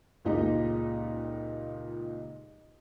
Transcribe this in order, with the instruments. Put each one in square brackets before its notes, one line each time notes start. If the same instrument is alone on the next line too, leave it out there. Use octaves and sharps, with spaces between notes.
[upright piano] C#2 A#2 D#4 G4 D#5 A#5